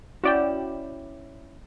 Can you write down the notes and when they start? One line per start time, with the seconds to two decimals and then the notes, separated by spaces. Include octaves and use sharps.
0.24 C#4 E4 F#4 D5 G5